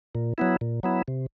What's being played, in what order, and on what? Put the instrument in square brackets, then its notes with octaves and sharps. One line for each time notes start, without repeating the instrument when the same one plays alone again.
[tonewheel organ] A#2
F#3 B3 E4
A#2
F#3 B3 E4
C3